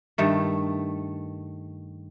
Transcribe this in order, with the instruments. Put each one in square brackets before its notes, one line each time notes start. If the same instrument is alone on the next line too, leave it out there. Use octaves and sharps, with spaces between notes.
[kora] G2 D#3 A3